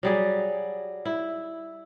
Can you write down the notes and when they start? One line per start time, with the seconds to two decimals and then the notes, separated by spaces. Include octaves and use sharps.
0.03 F#3 G3 G#4
1.05 E4